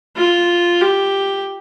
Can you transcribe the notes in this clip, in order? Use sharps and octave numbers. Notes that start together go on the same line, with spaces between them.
F4
G4